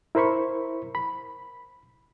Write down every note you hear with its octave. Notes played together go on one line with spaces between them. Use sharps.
E4 A#4 C5 B5 C#6
B5